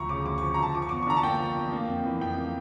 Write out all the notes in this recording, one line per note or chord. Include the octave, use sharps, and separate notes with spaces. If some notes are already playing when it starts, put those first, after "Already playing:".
Already playing: D2 F3 A#5 C#6
C#3 D6
D2 D6
F3 C#6
A#5
D2 A5
F3 D6
C#6
E2 D6
C#6
D3 A#5
A5
A#3 G5
F3
E2
A#3
F2
E3
F2 G5
A#3